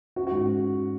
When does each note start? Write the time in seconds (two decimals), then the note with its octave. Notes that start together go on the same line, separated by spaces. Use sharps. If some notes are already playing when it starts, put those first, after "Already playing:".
0.16 C#4 F#4
0.27 G#2 F#4